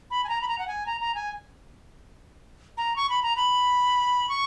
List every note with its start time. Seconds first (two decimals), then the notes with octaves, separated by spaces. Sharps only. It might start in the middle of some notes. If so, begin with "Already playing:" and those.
0.11 B5
0.24 G#5
0.29 A#5
0.42 B5
0.48 A#5
0.59 F#5
0.68 G#5
0.87 A#5
1.01 A#5
1.15 G#5
2.77 A#5
2.96 C#6
3.10 B5
3.23 A#5
3.37 B5
4.29 C#6